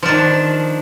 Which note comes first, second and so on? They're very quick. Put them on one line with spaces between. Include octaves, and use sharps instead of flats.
F3 D4 D#3